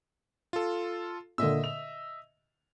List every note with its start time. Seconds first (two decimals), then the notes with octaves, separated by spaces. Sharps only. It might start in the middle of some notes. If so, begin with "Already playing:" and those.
0.53 F4 A4
1.38 A#2 D3 D#5 E5 E6
1.64 F7